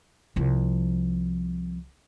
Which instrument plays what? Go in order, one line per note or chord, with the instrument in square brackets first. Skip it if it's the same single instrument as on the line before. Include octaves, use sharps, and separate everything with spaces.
[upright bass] C2 F3